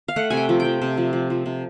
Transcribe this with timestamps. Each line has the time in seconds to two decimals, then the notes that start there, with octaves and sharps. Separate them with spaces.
0.08 F5
0.16 A3 F#5
0.30 C3 G#5
0.37 G5
0.49 F3
0.60 F3 G5
0.82 C3
0.97 F3
1.13 F3
1.30 F3
1.46 C3